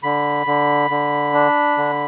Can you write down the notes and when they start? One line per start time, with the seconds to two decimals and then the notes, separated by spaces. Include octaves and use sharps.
0.03 D3 B5
0.47 D3
0.90 D3
1.34 D4
1.78 D3